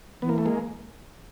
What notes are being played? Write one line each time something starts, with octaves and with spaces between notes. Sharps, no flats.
E3 B3
A#3
A3
G#3 A#3